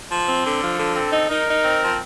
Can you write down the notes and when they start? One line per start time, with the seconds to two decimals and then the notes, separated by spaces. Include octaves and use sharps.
0.08 F3
0.25 C4
0.42 D3
0.60 F3 A4
0.77 D3
0.94 C4 A4
1.12 D#4
1.29 D#4 A#4
1.47 D#4
1.64 C4
1.81 F3